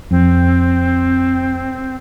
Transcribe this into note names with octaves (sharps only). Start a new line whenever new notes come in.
F2 C4